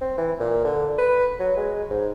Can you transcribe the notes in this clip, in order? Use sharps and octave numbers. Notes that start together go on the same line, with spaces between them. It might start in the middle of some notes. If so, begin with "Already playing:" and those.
C4
E3
A#2
D3
B4
F#3
G#3
G#2